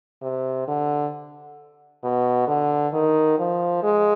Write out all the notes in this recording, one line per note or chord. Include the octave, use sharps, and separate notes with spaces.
C3
D3
B2
D3
D#3
F3
G#3